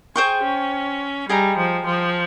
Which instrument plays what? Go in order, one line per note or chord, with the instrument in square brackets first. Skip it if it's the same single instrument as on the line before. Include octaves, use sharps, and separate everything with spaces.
[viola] G#4 [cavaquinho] C5 G5 C#6
[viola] C#4
[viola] G3 [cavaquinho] G#4 D#5 G5 A#5
[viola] F3
F3